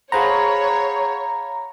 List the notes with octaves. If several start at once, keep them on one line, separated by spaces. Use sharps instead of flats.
G#4 C5 C#5 F5 F#5 A#5 B5